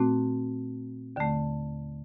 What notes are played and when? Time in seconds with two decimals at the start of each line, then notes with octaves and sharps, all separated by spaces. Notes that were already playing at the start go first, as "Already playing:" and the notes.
Already playing: A#2 A3 C4 F#4
1.16 D#2 D3 A3